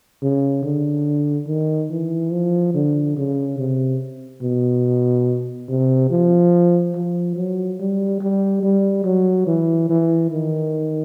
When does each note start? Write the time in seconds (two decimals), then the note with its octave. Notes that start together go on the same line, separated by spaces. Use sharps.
0.22 C#3
0.64 D3
1.48 D#3
1.91 E3
2.32 F3
2.74 D3
3.17 C#3
3.59 C3
4.42 B2
5.69 C3
6.11 F3
6.95 F3
7.36 F#3
7.80 G3
8.21 G3
8.63 G3
9.05 F#3
9.47 E3
9.89 E3
10.31 D#3